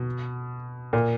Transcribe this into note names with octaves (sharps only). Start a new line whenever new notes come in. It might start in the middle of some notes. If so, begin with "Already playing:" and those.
Already playing: B2
A#2